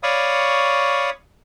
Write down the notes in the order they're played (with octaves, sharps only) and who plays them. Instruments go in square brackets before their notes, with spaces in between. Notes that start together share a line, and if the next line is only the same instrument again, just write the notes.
[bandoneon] C#5 D5 F5 B5 C#6 D#6